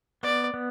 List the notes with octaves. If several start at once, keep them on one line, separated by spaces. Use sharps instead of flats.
B3 D5
B3